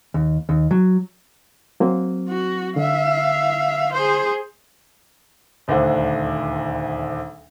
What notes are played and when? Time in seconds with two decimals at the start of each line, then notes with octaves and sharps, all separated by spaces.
0.14 D#2
0.49 D#2
0.71 F#3
1.80 F#3 A#3 C4
2.29 F#4
2.76 D3 E5 F5
3.93 G#4 C5
5.68 D#1 D2 D3 C5 F#5